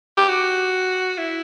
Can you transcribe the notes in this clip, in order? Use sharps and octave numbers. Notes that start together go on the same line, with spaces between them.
G4
F#4
E4